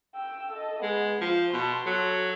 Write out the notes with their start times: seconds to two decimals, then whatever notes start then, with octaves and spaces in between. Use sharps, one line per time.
0.15 G5 E6
0.52 A4 D#5
0.83 G#3 B3
1.21 F3 F4 C5
1.53 B2 A5 C6
1.86 F#3 A4